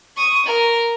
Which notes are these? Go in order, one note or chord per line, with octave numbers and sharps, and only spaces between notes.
C#6 D#6
A#4